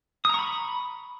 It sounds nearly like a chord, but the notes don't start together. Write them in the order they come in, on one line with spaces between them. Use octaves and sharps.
D#6 A#5 C#6 B5